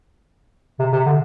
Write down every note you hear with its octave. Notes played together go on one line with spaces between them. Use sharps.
C3
C3
D3